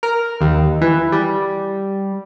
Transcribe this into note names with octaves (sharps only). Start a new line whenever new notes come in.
A#4
D#2
E3
G3